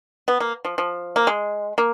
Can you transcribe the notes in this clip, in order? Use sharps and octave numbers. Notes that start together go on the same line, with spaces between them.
B3
A#3
F3
F3
A#3
G#3
A#3